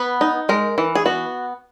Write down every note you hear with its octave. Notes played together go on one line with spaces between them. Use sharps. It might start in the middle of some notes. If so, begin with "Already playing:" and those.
Already playing: B3 B4
D#4
G#3 A#4
E3
G#4
B3 F#4